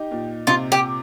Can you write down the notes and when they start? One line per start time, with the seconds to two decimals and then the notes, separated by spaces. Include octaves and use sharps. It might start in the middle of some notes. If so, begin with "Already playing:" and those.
Already playing: D#4 G4
0.11 A#2
0.47 C3 F4
0.72 G4